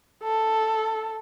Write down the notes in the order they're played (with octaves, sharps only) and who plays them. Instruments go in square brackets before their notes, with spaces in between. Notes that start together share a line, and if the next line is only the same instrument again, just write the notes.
[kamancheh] A4